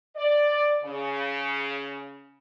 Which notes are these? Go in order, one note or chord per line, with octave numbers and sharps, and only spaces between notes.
D5
C#3